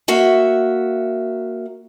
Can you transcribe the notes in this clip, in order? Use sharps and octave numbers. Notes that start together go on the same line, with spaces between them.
A#3 F#4 E5